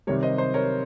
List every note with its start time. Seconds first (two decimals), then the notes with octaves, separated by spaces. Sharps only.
0.07 C3 D#3 G3 A#4 C#5
0.23 C5 D#5
0.38 C5 D#5
0.54 A#4 C#5